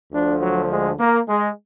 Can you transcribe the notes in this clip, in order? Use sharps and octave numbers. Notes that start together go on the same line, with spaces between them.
D2 D3 F3 D4
F#3
G#3
A#3
G#3